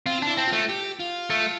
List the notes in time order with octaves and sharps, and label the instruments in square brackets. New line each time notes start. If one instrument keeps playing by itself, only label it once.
[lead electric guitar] C4 [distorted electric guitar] F4
[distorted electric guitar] D4 [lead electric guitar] E4
[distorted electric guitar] C4
[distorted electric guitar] A3 [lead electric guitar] F4
[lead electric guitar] G4
F4
[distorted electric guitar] A3